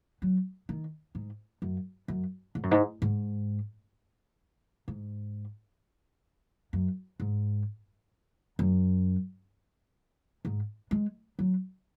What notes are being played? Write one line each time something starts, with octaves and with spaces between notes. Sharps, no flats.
F#3
D#3
G#2
F#2
F#2
G#2
F#2
G#2
G#2
G#2
F#2
G#2
F#2
G#2
G#3
F#3